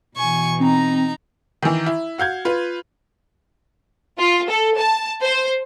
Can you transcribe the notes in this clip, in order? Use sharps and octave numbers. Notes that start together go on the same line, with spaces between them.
B2 E3 G#5 C#6
C4 D#4 A#5
D#3 E3
E4
F#4 F5 G6 G#6
F4 B4
F4
A4
A5
C5